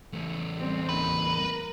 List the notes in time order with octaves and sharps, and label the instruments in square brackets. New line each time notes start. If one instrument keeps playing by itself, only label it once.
[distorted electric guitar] E2 A3
[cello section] G3 C4 C#4
[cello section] D#2 D#4 [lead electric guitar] B4
[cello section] A#4